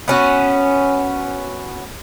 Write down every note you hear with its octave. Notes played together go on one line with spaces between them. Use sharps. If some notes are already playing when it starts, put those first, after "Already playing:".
B3 C#4 F#4